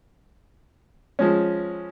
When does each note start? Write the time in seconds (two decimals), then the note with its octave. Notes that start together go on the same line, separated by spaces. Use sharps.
1.19 F3 G#3 C#4